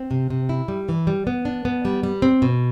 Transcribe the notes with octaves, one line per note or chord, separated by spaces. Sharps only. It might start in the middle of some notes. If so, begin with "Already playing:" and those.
Already playing: C4
C3
C3
E4
G3
E3
G3
B3
D4
B3
G3
G3
C4
B2